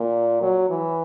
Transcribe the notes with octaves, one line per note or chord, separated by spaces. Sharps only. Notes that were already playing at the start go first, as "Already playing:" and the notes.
Already playing: A#2
F#3
E3